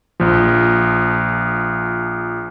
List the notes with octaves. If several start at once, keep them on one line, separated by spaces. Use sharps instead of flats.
A#1 F3